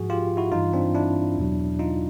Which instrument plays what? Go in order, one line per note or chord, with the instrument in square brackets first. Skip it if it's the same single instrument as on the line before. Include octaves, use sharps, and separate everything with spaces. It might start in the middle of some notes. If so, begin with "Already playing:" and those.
Already playing: [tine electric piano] G#2 F3 F#4 G#4
F4 G4
E4 F#4
G2 E3 D#4 F4
C4 D4
D4 E4
E2 B2 F#3
D#4 F4